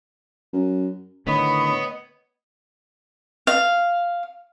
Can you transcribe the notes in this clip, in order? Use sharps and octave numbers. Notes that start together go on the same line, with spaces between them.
F#2
A2 D3 D#3 B3 C#5 D#5 B5
F5